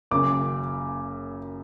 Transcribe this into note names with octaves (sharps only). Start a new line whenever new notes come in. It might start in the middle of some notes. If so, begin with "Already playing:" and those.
F#1 F#2 C#3 D6